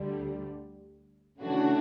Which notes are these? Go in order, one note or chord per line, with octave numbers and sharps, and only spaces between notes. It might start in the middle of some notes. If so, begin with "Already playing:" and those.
Already playing: D2 D3 G3
C#3 E3 A3 D4 F#4